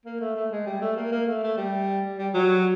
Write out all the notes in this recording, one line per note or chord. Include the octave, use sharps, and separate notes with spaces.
A#3
A3
A3
G#3
G3
A3
A#3
A#3
A3
A3
G3
G3
F#3